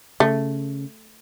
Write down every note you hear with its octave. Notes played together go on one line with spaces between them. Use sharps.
C#3 A3